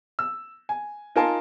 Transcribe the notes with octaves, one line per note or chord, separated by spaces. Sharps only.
E6
G#5
D#4 F4 A#4 G#5 A5 C6